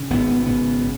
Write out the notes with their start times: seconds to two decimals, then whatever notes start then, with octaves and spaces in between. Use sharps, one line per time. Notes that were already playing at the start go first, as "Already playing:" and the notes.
Already playing: C#3
0.10 G#1 B3
0.29 B3
0.46 C#3 B3